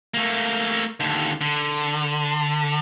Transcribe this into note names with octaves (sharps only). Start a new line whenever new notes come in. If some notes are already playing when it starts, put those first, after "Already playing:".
A3 A#3
D#2 D3
D3